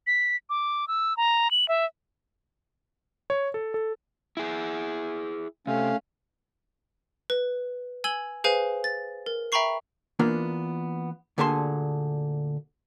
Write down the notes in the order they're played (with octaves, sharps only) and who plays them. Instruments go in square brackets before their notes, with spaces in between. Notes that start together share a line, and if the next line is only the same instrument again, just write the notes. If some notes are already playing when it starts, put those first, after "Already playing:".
[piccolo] B6
D6
E6
A#5
F#7
E5
[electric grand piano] C#5
A4
A4
[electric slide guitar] E4 G#4
[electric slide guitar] C3 [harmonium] A3 C#4 F5
[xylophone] B4
G#5 E6 G#6 F#7 G7
G#4 B4 C5 F5 G#5
A6
A#4
E5 G5 A#5 B5 C#6 C7
[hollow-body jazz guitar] E3 A#3 B3 D4 F4
D2 A#2 D3 G#4 A5 C6